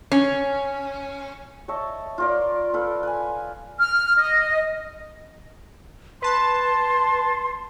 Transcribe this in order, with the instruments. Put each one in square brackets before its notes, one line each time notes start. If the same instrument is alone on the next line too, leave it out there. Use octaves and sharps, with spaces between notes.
[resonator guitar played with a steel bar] C#4
[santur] C#5 D#5 E5 A5
F4 A#4 D5
F4 A4 B4
B4 G#5
[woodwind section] F6
D#5
[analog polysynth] B4 A5 [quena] C6